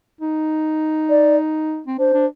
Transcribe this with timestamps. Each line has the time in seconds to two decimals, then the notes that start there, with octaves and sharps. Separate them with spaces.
0.21 D#4
1.10 D5
1.87 C4
1.99 D4 C5
2.14 D4